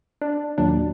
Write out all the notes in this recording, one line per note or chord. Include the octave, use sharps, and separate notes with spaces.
D4
D#2 A#2 F#3 D4